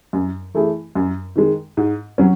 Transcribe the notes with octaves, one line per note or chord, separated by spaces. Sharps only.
F#2
E3 A3 E4 G#4
F#2
D#3 G#3
G#2
F#3 C#4